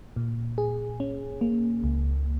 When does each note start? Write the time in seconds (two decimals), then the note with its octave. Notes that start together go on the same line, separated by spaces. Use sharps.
0.16 A#2
0.58 G#4
1.00 C#4
1.41 A#3
1.84 C#2